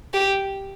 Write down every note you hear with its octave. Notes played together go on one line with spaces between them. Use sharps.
G4